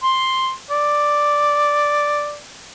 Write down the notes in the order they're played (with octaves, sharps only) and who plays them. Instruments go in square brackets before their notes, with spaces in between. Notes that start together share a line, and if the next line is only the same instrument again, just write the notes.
[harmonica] C6
D5